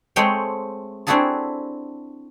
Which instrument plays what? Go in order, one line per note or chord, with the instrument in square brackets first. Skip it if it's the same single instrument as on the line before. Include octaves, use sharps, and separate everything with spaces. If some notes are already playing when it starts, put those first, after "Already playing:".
[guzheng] G#3 A3 C4 C#5 G5
C4 D4 E4 F#4 G#4 A4